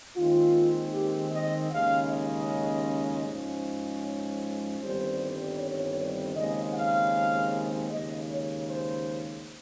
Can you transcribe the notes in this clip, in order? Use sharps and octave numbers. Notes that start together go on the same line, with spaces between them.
D#2 D#3 G#3 C4 F4
G4
D#5
D#2 C#3 G#3 C#4 F5
D#5
G#2 F3 G#3 C#4
C#5
G1 G2 D#3 G3 C4 C5
C#5
D#2 C#3 G#3 C4 D#5
F5
D#2 C#3 G#3 D#5
C#5
C5